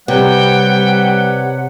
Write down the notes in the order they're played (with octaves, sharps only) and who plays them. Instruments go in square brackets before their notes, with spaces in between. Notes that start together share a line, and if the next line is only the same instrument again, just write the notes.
[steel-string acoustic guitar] C3 [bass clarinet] G3 [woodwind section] B4 C#5 F#5 [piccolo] G5